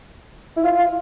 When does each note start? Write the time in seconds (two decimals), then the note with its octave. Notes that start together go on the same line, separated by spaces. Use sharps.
0.56 E4
0.64 F4
0.76 F4